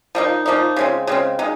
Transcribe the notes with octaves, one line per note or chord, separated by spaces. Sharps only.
F3 A#3 D#4
F3 A#3 D#4
C#3 G#3 C4
C#3 G#3 C4
G#3 D#4